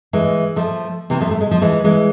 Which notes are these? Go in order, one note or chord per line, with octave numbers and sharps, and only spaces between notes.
E3 G#3
F3 A3
C3 E3
F3 A3
A3
G#3
F3
E3 G#3
E3 G#3